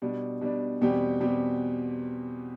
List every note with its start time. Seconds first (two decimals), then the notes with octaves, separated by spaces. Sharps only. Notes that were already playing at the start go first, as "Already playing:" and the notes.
0.02 B2 G3 D4
0.41 B2 G3 D4
0.81 E2 B2 G3 C4 G4
1.20 B2 G3 C4 G4